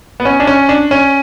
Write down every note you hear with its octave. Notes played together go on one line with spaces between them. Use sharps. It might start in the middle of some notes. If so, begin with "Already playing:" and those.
B3
C#4
D4
C#4
D4
C#4